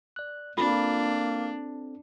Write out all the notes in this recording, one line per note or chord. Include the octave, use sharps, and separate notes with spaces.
D5 F#6
A#3 C4 D4 F4 A4